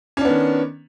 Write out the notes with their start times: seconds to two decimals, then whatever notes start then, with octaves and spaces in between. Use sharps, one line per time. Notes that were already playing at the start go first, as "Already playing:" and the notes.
0.17 C#4
0.21 D4
0.25 B3
0.29 D#3